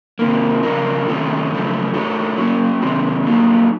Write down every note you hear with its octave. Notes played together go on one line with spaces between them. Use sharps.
C3 D#3 A#3
C#3 F3 A#3 F4 A#4
C3 D#3 A3 C#4
F#2 C#3 F3 A3
A3 D#4 F#4 A4 C#5
F#3 A#3 C#4
C3 D#3 F#3 C4 F#4
F#3 A#3 D#4